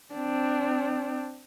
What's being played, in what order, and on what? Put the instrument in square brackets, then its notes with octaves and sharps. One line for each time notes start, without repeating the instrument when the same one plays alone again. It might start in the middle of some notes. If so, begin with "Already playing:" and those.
[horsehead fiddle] C4 D4